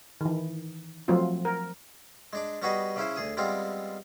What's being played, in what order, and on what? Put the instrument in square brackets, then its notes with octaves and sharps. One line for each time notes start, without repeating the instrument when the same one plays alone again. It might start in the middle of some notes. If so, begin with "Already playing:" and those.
[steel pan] D#3 E3
F3 F#3 A3 C4 F4
A#4
[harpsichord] G#3 D4 D5
G3 B3 F#4 G#4 B4 D#5
C#3 C#4 E4 C5
D2 G#4 D#6
G3 G#3 B3 C4 F4